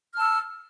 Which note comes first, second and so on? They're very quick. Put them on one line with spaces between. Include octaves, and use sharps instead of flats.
F6 A5 E6